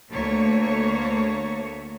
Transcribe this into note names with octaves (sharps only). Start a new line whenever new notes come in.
D2 A3 A#3 C#5